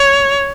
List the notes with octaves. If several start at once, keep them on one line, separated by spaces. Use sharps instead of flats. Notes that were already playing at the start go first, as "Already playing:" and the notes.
Already playing: C#5